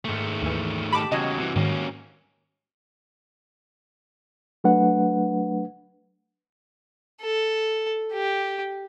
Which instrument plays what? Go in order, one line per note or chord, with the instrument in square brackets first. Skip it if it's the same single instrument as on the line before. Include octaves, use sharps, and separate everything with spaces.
[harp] G#2 A#3 [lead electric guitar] D#3 A3
[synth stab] D#2 E3
[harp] G4 D#5 A5 [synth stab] B5 D6
[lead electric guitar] E2 C#3 [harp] G3 F#4 G#6 [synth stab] D#5
[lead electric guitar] C3 E3 [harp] B4
[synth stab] G#2 D#3 [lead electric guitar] A#3 C#4
[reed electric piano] F#3 A3 D4 B4 F#5
[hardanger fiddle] A4
G4